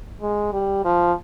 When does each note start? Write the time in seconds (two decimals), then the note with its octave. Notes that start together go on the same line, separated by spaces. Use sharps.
0.22 G#3
0.53 G3
0.85 F3